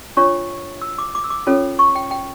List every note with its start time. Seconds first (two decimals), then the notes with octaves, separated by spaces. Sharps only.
0.17 D4 F4 C#5 C#6
0.82 E6
0.98 D6
1.15 D6
1.24 E6
1.30 D6
1.47 C#4 F4 A4 C#5
1.79 C#6
1.95 G5
2.11 G5